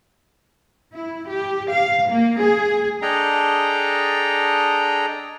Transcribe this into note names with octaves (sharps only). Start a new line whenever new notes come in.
E4
G4
F5
A#3
G#4
D4 G#4 A4 D#5 G5 A#5